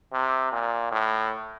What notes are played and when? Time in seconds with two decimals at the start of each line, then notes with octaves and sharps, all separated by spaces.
0.13 C3
0.52 A#2
0.92 A2